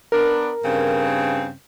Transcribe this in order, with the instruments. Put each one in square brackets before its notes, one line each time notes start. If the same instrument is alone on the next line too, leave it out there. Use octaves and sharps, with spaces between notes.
[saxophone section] B3 D4 [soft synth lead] A#4
[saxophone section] G2 C#3 C4